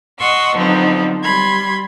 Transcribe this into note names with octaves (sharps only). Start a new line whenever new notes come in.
D#5 F#5 C6 C#6 E6
D3 F3 F#3 B3 C4 D#4
G3 B5 C6 G#6